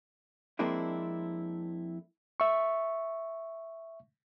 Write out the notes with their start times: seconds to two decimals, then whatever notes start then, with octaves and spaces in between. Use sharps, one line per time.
0.59 F2 G#3 A#3 C4 D4 E4
2.40 E5 C#6